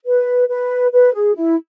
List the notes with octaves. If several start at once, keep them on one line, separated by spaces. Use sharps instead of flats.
B4
B4
B4
G#4
E4